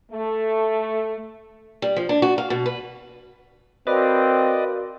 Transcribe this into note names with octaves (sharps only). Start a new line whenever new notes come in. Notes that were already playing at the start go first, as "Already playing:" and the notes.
A3
G3
F3
D4
F#4
F5
B2
B4
C4 F#4 A#4 B4 D5 D#5 F5